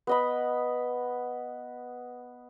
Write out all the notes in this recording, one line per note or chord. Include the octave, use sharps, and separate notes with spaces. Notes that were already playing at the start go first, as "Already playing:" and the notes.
B3 D#5 B5